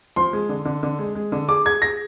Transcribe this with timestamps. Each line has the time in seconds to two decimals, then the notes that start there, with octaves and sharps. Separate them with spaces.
0.16 F3 C6
0.33 G#3
0.49 D3
0.65 D3
0.83 D3
0.99 G#3
1.15 G#3
1.32 D3
1.49 G#4 D6
1.65 G#4 G#6
1.82 G#4 A#6